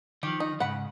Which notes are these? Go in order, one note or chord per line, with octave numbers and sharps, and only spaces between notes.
D#3 F3 G4
D#4
G#2 C#3 F#5 B5